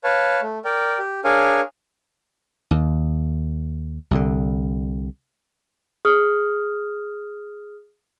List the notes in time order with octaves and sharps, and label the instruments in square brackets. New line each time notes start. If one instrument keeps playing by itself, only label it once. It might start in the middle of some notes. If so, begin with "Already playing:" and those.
[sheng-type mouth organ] B4 C#5 F5 A5
A3
A#4 D5 G5
G4
D4 G#4 A#4 C#5 F5 G#5
[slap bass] D#2
C2 D3
[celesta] G#4 D#6 F6